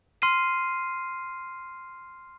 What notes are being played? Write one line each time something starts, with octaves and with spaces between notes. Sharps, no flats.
C6 F6 C7 D#7